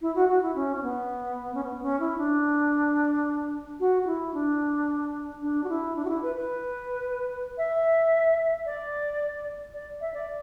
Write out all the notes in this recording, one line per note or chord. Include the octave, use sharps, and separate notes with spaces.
E4
F#4
F#4
E4
C#4
C#4
B3
C#4
B3
C#4
E4
D4
F#4
F#4
E4
D4
D4
F#4
E4
D4
F#4
E4
B4
B4
E5
D5
D5
E5
D5